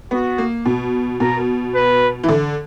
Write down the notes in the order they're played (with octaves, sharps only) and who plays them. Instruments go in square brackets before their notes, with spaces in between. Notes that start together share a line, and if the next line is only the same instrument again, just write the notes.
[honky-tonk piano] B3 [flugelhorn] F#4
[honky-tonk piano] A#3
B2
[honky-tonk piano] B2 [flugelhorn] A#4
[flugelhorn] B4
[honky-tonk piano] E3
D3